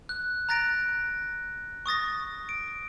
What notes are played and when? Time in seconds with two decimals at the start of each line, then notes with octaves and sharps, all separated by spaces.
0.09 F#6
0.49 A#5 F#6 A6 A#6 D7
1.86 C#6 D#6 A6 A#6
2.49 D7